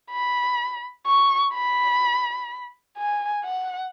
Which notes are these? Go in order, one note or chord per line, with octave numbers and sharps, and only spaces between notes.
B5
C#6
B5
G#5
F#5